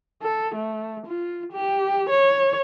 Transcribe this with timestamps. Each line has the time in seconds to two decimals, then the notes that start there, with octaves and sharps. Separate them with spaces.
0.23 A4
0.55 A3
1.06 F4
1.52 G4
2.10 C#5